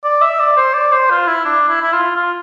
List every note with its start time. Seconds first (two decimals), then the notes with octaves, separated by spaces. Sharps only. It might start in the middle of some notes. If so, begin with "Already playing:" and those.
0.04 D5
0.21 E5
0.39 D5
0.57 C5
0.74 D5
0.92 C5
1.10 F4
1.27 E4
1.45 D4
1.68 E4
1.81 E4
1.93 F4
2.16 F4